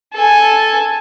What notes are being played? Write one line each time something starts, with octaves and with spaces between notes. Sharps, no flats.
A4 G#5